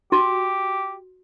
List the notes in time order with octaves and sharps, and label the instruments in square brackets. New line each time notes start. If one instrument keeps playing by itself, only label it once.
[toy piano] F#4 [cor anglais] G4